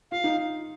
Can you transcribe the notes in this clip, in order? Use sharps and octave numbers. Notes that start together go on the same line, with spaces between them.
F4 F5
D#4